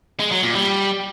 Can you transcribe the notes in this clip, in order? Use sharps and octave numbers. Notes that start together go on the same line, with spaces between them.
G#3
F#3
A#2
G3